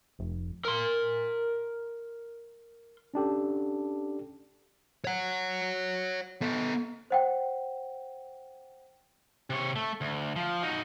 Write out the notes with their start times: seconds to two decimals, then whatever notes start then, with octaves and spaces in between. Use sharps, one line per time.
0.19 F1
0.65 A#4 C6
3.14 C#4 D4 G4 A4
5.05 C#5 F#5
6.42 B3 A4
7.10 C5 F#5 G5
9.50 C3 C#5
9.76 A3
10.01 D2
10.36 F3
10.63 D#4 F#4